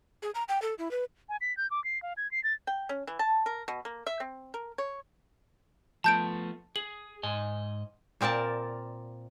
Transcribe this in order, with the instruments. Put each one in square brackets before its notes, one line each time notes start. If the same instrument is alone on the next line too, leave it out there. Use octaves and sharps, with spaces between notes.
[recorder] G#4
A#5
G5
A4
E4
B4
[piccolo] G#5
B6
G6
D6
C7
F5
G#6
C7
A6
[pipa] G5
C#4
E3
A5
A#4
B2
A#3
E5
C4
A#4
C#5
[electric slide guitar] F3 A3 B3 [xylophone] A5 G6 D7
[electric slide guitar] G#4 [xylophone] F#7
[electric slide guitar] G#2 D#5 G#5
[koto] A#2 C4 A#4 D5 A5